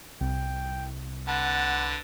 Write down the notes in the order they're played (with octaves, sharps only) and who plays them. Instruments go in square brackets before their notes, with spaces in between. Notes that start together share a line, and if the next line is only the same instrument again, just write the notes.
[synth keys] C2 [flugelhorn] G5
[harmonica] D3 B4 A5 [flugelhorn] F#5